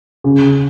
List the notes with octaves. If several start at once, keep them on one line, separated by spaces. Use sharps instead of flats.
C#3